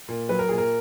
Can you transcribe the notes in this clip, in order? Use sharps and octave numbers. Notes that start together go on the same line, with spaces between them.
A#2
F#3 B4
A#4
A#2 G#4
A#4